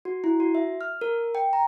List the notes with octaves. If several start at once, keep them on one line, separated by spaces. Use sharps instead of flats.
F#4
E4
F#4
E5
F6
A#4
G5
A#5